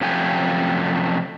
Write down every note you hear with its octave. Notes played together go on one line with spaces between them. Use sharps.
F#2 C3 F3 A3 G5 G#5